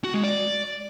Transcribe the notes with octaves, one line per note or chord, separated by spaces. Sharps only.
F#4
G#3
D5